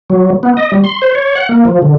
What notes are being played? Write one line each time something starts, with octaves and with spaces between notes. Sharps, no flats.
F#3
B3
D#5
G3
C6
C5
C#5
F#5
A#3
F3
D3